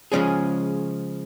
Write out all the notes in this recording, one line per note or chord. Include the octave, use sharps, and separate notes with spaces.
C#3 F3 G#3 C#4 G#4